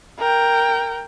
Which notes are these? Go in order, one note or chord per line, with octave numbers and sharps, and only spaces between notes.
A#4 G5